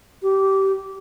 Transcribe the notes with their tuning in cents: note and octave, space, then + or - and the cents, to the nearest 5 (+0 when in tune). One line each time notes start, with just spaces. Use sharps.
G4 -20